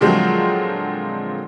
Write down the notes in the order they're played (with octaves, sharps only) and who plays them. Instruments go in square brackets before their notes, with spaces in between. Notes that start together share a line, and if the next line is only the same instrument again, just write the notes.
[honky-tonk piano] A#2 D3 F3 F#3 G#3 C4